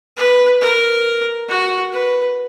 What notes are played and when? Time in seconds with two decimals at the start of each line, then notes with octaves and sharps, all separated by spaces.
0.17 B4
0.61 A#4
1.48 F#4
1.92 B4